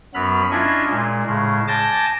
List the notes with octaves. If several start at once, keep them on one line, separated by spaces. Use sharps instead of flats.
F#2 F#3 B3 B5 F6
C#4 D4 E4 F4 D#5 G#5
A#2 G#3
A2 C#3 G#3
G#5 A5 D6 G6 A6 A#6